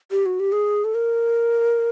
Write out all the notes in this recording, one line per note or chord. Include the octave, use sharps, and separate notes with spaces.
G4
F#4
G4
G#4
A4
A#4